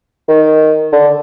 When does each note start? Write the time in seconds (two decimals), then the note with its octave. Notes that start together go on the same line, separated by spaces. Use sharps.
0.28 D#3
0.93 D3